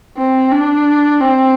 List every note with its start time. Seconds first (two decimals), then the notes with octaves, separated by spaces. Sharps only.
0.18 C4
0.52 D4
1.20 C4